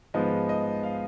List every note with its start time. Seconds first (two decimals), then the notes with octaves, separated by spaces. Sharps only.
0.14 G#2 F3 G#3 B3 D#5
0.49 D#5
0.83 F5